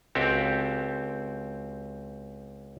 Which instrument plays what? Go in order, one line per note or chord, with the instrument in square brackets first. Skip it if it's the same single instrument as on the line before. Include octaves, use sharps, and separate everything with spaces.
[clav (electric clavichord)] C#2 C4 F#4 G4 A4